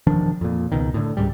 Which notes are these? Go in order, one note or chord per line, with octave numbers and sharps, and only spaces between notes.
E1 D#3 F3 D4
F2 A#2
C#2 B2 D#3
A2 D3
C#2 G#2 G3